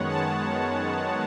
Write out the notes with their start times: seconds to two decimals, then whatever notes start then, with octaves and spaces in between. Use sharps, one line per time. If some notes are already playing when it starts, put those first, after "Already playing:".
Already playing: F#2 D#3 G#3 B3 C#5 F#5
0.08 A5